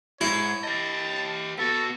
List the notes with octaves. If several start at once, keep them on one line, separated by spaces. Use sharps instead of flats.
G#2 E4 C#5
G4 D#5 A5
B3 F#4 A4